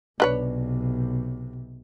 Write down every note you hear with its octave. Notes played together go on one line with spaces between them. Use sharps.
B1 C3 D4 B4 C#5